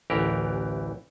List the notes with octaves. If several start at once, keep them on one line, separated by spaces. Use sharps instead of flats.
A1 D2 E3 G4 A#4